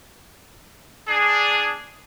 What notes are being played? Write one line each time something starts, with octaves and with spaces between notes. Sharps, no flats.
D4 G#4